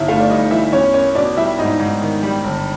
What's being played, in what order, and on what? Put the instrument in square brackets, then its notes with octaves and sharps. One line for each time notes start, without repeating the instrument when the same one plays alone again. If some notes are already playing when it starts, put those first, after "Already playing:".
Already playing: [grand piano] G1 [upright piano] D#4 E4 E5
[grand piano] A3 [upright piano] F4 F5
[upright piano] D5
[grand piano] G2 [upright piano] D#4 D#5
[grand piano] E3 [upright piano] E4 E5
[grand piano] E2 [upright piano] C#4 C#5
[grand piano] A#3 [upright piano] C#4 C#5
[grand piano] B2 [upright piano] D4 D5
[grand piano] G3 [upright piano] E4 E5
[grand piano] G#2 [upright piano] D#4 D#5
[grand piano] G#2
D#3
G3
G1